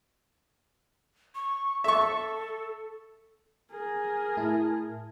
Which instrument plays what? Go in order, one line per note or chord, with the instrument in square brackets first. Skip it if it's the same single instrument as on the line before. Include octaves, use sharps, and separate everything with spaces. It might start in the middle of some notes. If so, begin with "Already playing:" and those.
[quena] C#6
[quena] A4 [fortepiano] E5 C#6
[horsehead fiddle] G#4 A#4
[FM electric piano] A2 E4 A5